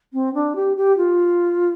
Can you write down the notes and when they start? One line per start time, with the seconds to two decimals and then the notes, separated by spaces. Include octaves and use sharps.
0.13 C4
0.34 D4
0.55 G4
0.76 G4
0.97 F4